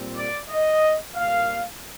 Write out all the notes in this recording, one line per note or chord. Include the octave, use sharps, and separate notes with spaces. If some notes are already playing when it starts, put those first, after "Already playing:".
Already playing: A#2 G3 C4
D5
D#5
C2 A#2 G3 A#3 F5